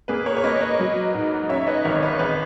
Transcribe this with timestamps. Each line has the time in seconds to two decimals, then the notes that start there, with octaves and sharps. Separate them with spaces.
0.08 A#3 G#4 B4
0.26 A#4 C#5
0.37 C#5
0.44 A#3 B4 D#5
0.61 B4 D#5
0.79 F#3
1.14 G#2
1.49 C#4 C#5 E5
1.67 B4 D#5
1.85 G#1 A#4 C#5
1.97 C#5
2.03 B4 D#5
2.19 G#1 G#4 B4